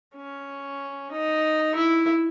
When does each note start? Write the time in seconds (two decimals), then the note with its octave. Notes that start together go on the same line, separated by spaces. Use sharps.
0.15 C#4
1.11 D#4
1.75 E4